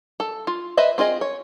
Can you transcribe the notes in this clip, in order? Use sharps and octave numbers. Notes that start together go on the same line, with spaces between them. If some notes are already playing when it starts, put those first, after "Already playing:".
A4
F4
B4 C5 D#5 E5
C4 F4 G#4 D#5
C#5